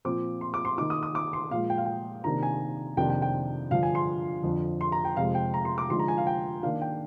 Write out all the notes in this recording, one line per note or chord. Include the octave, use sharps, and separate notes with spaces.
A#2 F3 C4 D6
C6
D6
C6
D#3 A#3 D#4 D6
D#6
D#6
D6
C6
A#2 F3 G#3 F5
G5
F5
G5
C3 D#3 A#3 D4 A#5
G#5
F2 C3 D#3 A#3 D4 G5
G5
G5
G2 D3 F3 F5
G#5
C6
F2 D3 F3
C6
A#5
G5
F2 C3 F3 G#3 F5
G5
A#5
C6
D6
D3 F3 G#3 D#4 C6
A#5
G#5
F5
G5
D#3 A#3 D4 F5
G5